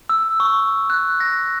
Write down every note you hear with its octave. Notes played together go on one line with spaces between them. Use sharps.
E6
C#6
F#6
A#6